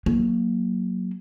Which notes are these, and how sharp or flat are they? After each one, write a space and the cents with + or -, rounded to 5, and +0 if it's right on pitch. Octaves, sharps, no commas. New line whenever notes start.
F#3 +0 A#3 +0